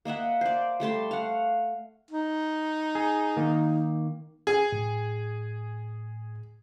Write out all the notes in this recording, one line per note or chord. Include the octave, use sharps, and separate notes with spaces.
A#3 D#5 E5 F#5
C5 D5
G3 A3 A5 C6
F5 F#5
D#4
G#4
D#3 A#3
G#4
A2